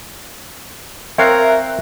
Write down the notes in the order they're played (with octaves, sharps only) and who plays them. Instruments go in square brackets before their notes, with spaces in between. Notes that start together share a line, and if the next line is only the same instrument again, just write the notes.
[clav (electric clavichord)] C4 C#5 F5 [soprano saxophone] A#4 [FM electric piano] E5 F#6